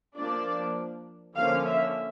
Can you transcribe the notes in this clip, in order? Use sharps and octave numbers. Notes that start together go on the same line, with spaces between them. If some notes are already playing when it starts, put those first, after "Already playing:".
F3 A#3 D4 D5
D3 F3 A#3 C#4 F5
E5